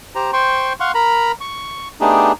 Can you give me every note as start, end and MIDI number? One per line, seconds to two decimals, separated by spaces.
0.15 0.31 67
0.15 0.31 72
0.15 0.31 82
0.33 0.73 72
0.33 0.73 79
0.33 0.73 84
0.33 0.73 85
0.80 0.92 77
0.80 0.92 78
0.80 0.92 84
0.80 0.92 85
0.95 1.32 70
0.95 1.32 82
0.95 1.32 83
1.41 1.88 85
2.01 2.32 57
2.01 2.32 59
2.01 2.32 62
2.01 2.32 63
2.01 2.32 67
2.01 2.32 68